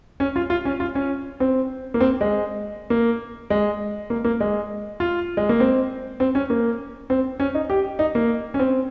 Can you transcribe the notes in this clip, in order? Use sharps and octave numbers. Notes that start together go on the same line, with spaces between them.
C#4
F4
F4
C#4
F4
C#4
C4
A#3
C4
G#3
A#3
G#3
A#3
A#3
G#3
F4
G#3
A#3
C4
C4
C#4
A#3
C4
C#4
D#4
G4
D#4
A#3
C#4
C4